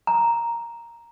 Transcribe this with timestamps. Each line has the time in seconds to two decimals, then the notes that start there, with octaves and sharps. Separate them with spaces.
0.07 A#5